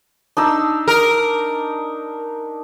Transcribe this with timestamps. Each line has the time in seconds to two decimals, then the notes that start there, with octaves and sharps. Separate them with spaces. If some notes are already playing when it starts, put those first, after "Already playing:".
0.37 D4 D#4 E6
0.88 A#4